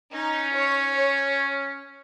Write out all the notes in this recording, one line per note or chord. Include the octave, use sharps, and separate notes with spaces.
C#4 D#4
C#5
C#5